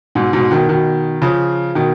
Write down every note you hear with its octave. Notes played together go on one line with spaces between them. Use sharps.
G#2 B2
G#2 B2
B2 D#3
B2 D#3
C#3 F3
B2 D#3